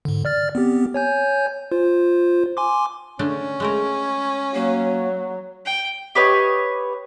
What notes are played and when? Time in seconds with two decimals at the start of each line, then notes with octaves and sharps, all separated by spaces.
0.05 G#2 D3
0.25 D5 F6 A6
0.55 B3 C4 G4
0.94 C#5 G#5 G6
1.72 F4 C5
2.57 G#5 C6 D6
3.19 D3 A3 C#4 D4
3.60 G#3 A3 A#4
4.55 F#3 A#3
5.65 G5
6.15 G4 B4 C#5 D#5